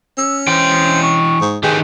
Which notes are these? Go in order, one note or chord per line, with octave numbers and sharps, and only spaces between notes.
C#4 E6
E3 C5 G5
C#6
G#2
D#3 G4 G#4 B4 G5